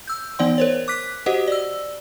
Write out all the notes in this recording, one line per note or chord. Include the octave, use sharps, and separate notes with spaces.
E6 G6
E3 B3 D#4 D5 F#5 C6
A#4 C5 C#5
D6 F#6 B6
F#4 G4 C5 D#5 F#5
D5 E6